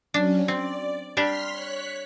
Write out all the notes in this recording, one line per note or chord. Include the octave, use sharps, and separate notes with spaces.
F#3 C#4 D4
C4 D5
G3 D4 G4 C6 F6 B6
C#5 F#6 B6